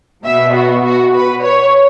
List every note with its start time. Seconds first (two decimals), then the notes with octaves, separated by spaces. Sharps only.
0.25 B2 B3 E5
0.54 F#4
0.84 F#4
1.14 B4
1.43 C#5